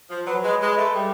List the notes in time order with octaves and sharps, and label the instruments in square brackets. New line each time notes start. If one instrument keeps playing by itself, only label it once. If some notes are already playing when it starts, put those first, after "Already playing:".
[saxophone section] F3
[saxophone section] F#3 [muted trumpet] B4
[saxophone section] G#3
G#3
A3
G3